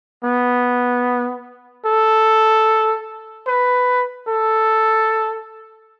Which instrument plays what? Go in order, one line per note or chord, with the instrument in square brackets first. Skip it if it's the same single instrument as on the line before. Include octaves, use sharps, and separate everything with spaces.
[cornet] B3
A4
B4
A4